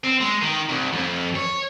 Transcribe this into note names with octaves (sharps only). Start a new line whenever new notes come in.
C4
G#3
D#3
C2
F2
C#5